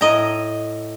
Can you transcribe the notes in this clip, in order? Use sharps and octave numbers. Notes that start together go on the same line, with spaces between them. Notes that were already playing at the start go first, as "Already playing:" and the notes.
A2 D#5 A#5